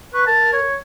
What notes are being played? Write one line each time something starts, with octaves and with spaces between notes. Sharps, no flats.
B4 C#6
A#4 A5
C#5